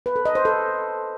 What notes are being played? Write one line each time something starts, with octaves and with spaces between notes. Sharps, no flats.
B4
A4
D#5
C5
A4